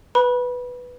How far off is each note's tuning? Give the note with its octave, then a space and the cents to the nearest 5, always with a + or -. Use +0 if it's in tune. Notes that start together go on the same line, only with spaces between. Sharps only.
B4 +0 B5 -25